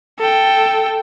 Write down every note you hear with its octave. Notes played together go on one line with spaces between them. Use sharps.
A4 G5